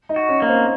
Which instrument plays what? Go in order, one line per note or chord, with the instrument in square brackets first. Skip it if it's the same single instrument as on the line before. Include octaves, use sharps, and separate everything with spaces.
[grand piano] D#4 D#5
[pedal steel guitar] F#4
[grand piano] C#4 C#5
[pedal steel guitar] A#3
[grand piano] C4 C5